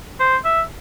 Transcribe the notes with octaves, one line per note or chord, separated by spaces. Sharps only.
C5
E5